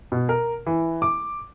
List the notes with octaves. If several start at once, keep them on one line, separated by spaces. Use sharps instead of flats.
B2
A#4
E3
D6